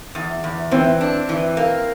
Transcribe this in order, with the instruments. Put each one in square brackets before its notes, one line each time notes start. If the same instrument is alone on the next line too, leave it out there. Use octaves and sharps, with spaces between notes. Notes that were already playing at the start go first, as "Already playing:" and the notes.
[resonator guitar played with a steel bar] E2
E2
[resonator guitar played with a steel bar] E3 [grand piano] C4
[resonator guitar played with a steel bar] D4
E3
A#3